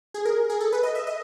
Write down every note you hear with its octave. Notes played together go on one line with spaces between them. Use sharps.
G#4
A#4
G#4
A4
B4
D#5
E5
D#5